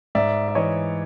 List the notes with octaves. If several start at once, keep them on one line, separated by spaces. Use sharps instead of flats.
G#2 D5 E5
E5
E3 C#5 D#5